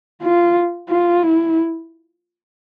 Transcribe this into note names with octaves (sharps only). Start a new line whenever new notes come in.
F4
F4
E4